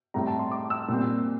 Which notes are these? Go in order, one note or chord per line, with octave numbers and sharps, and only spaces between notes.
A2 G3 C4 A#5
A5
C6
D6
E6
A#2 G3 C4